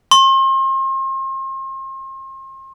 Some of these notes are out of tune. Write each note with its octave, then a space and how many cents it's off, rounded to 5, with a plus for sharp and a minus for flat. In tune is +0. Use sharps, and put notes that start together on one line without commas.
C6 +40